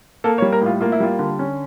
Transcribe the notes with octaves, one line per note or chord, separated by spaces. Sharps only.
A#3 A4
C#5
G3
A#4
A2 F4
A#3 F4
E4
G3 F4
D3
C#4